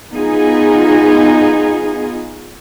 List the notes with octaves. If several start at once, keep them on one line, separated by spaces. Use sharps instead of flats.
B3 D#4 F4 G#4